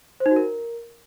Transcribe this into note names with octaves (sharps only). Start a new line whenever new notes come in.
C5
D#4
F#4
A#4